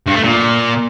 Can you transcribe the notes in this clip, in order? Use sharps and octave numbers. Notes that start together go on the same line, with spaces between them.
G2
A3
A#2